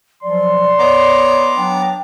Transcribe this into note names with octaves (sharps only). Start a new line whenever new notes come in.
F3 F#3 D5 C6
B3 C#5 D#5 A#5 D6
F#3 D4 G5